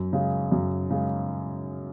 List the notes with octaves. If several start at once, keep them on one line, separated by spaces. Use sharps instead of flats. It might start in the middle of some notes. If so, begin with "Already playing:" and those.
Already playing: F#2
C#3 G#3
F#2
C#3 G#3